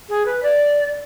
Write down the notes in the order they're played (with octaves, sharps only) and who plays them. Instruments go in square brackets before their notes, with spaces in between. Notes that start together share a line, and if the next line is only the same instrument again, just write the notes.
[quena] G#4
B4
D5